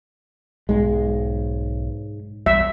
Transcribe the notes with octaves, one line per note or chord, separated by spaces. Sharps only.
B1 G#2 G#3
B1 E2 G3 E5